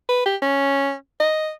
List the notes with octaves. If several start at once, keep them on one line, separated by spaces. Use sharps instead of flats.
B4
G4
C#4
D#5